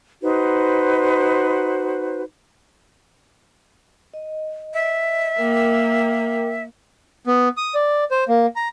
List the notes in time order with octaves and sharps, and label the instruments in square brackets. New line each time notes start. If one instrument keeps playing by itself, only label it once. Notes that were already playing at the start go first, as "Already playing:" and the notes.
[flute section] D#4 F#4 B4 C5
[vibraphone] D#5
[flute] E5
[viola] A#3 [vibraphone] A#4 G5 D6
[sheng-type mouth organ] B3
D#6
D5
C5
A#3
A#5